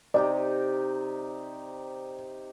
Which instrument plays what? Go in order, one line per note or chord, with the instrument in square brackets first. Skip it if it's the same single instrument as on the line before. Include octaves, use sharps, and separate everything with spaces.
[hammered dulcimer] C3 D#4 G4 [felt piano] D5